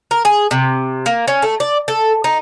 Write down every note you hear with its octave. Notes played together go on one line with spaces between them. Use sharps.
A#4
G#4
C3
A#3
C#4
A3
D5
A4
D#4